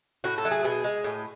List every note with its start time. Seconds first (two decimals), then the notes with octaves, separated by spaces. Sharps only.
0.24 A2 F#4
0.38 A4
0.45 F#3 A3
0.51 G#4
0.64 B2 G#4
0.84 G#3
1.04 A2